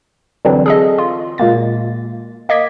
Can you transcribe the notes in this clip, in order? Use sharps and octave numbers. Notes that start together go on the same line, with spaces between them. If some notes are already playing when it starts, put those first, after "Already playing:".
D3 E3 F#3 G3 C4 D4
G#4 A4 D#5
F4
A#2 G#3 A#3 A6
A#3 D#5 D6 G#6 B6